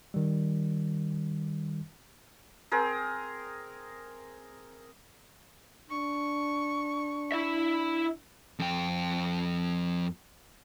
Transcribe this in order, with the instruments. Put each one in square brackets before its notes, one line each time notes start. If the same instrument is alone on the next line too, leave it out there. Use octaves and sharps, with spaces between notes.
[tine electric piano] D#3 G3
[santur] C4 G#4 A#4
[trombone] D4 [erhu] C#6
[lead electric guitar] E4 E5
F2 G5